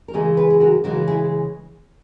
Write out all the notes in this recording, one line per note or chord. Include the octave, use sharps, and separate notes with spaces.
A#4
C#3 E3 G#3 E4 G#4
G#4 B4
G#4
F#4 A#4
C#3 E3 G#3 F#4 A#4
E4 G#4